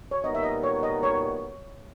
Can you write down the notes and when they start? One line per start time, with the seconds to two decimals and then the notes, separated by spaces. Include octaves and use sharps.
0.11 C#5
0.23 A#2 G3 B3 D#4 A#4 D#5
0.35 E5
0.43 D#5
0.63 C#5
0.83 D#5
1.03 C#5